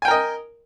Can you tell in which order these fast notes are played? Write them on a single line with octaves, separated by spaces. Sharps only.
G#5 G5 A#4 D#5